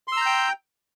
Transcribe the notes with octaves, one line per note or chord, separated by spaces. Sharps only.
G5 A#5 C6 E6 G6